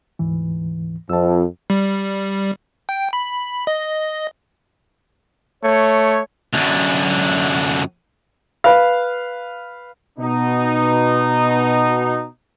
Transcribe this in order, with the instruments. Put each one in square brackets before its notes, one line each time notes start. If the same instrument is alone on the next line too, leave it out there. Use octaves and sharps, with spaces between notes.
[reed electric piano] D2 G#2 E3
[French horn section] F2 [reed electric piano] A5 E6
[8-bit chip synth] G3
G5
B5
D#5
[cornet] A3 [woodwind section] C#5
[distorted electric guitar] F#2 D3
[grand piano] B4 F5
[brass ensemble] B2 D#4